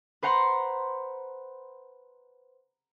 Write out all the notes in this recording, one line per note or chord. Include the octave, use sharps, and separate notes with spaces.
B4 C5 F#5 A#5 C6